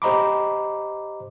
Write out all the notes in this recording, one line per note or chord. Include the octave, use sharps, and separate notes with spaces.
G4 C5 D#5 A#5 B5 D6